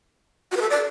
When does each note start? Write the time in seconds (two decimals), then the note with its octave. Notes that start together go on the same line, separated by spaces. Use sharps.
0.52 F#4
0.57 B4
0.61 A4
0.70 D5